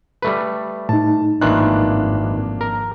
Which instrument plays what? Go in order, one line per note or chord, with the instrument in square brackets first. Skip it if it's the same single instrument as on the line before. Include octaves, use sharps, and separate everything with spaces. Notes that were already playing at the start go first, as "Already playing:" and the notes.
[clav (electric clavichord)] G3 A3 B4
[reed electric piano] A2 D#4 [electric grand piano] A5
[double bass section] G#1 F2 [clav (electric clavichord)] D#3 E3 F4 [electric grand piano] A#3 D4 F#6
[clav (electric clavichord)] A#4